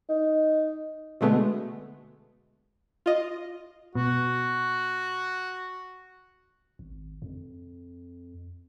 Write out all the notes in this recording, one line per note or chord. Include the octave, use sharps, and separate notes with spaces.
D#4
B2 D3 G#3 A3 B3
F4 D#5
B2 F#4
G#1
F2